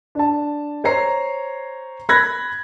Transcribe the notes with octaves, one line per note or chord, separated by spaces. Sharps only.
D4 A5
C5 C#5 A#5 C7
B5 F#6 G#6 A#6